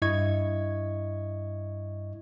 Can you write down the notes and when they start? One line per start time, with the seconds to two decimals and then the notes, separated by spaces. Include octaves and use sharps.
0.02 G2 E4 D#5 C#6 G#6